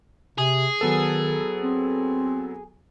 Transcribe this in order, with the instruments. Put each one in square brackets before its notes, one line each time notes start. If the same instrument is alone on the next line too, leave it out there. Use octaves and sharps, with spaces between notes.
[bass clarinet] C3 [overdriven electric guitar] G#4
[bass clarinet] D#3 [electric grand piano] F#3 B3 A4
[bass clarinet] C4